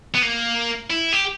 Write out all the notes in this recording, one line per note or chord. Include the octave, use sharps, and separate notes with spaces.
B3
A#3
E4
G4